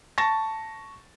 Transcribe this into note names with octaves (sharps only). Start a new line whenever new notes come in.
A5 C#6 A6 A#6